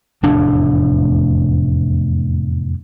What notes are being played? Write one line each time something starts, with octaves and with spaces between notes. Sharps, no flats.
F1 E2 A2 D4